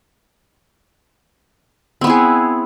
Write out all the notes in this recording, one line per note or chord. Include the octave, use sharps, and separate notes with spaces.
B3 C4 E4 G#4